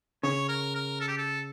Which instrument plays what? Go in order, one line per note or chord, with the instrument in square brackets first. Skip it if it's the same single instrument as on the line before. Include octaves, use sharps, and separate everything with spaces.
[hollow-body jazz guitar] C#3 [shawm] C#5
[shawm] A#4
A#4
A4
G4
A4